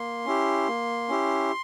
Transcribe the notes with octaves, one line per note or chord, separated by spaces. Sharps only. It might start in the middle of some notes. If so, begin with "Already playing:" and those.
Already playing: A#3 C6
C#4 E4 G4
A#3
C#4 E4 G4